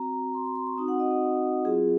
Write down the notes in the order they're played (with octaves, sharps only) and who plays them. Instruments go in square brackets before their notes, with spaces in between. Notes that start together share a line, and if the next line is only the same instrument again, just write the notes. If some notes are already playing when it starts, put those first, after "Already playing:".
Already playing: [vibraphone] C4 F#4 A#5
C6
C6
C6
C#6
C4 D#4 F#4 D#6
F#5
D#5
D#5
F#3 C4 F4 G#4